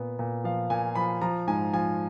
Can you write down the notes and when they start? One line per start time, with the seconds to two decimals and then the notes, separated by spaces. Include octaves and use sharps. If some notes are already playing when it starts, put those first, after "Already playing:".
Already playing: A#2 B3
0.19 A#2
0.44 F3 F5
0.70 A#2 G#5
0.95 F3 B5
1.21 F3 A#5
1.48 G#2 G#5
1.73 F3 G#5